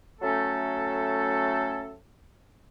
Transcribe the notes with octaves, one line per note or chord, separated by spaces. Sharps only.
A2 F#3 A3 C#4 A4